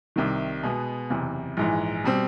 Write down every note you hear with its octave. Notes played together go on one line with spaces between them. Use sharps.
C2 C3 D#3
B2 G#3 B3
F#1 E2 C3
A#1 G#2 E3
B2 G3 C4